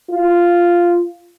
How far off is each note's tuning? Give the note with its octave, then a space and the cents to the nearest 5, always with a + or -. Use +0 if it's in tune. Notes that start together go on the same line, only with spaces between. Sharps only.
F4 -5